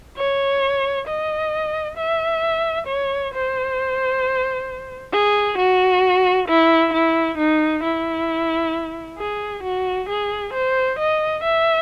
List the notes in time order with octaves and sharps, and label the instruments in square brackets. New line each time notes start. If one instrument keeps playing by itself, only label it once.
[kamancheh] C#5
D#5
E5
C#5
C5
G#4
F#4
E4
E4
D#4
E4
G#4
F#4
G#4
C5
D#5
E5